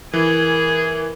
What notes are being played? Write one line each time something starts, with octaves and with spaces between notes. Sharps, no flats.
E3 G#4 A#4